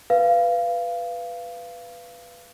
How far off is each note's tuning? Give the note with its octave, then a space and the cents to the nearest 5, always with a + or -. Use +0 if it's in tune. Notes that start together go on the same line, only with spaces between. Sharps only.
B4 +0 F5 -20